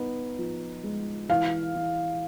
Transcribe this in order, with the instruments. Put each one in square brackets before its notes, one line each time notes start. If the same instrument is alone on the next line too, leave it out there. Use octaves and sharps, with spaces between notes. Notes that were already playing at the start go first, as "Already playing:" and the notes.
Already playing: [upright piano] B3 D#4
F3
G#3
[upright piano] E3 [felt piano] F5
[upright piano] E3